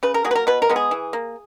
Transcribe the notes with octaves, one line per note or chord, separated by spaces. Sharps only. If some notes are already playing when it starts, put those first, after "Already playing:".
C#3 B4
A#4
F#3 A#3 G#4
B4
A#4
B2 B4
A#4
G#3 B3
G#4
E3
A#3